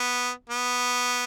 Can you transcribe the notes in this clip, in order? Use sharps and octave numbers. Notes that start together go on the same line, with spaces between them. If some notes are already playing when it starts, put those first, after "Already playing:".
Already playing: B3
B3